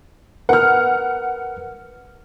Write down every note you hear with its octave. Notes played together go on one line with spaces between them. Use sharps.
A#4 B4 F#5 F6